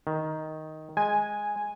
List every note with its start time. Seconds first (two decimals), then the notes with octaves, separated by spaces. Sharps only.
0.07 D#3
0.97 G#3 G#5